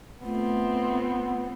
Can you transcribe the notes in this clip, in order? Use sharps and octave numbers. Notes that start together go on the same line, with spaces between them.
A3 B3 C4 F4